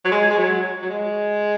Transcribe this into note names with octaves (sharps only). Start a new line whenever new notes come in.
F#3
G#3
G#3
F#3
F#3
G#3